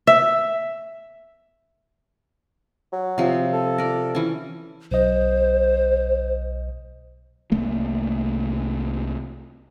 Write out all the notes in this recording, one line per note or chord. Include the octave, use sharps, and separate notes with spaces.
E5
F#3
C3 F3
A4
A#4 D5
E3 C#4
B1 C5 D#5
C2 A3 A#3